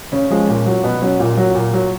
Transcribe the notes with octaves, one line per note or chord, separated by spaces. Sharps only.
C#3 C#4
F3 G#3
A#2
F#3
B2 B3
F#3 C#4
A#2 F4
F#3
A#2
F#3